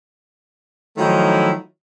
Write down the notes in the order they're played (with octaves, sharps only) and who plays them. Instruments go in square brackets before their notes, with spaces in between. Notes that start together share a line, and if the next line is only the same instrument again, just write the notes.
[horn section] D#3 F3 F#3 A3 D#4 E4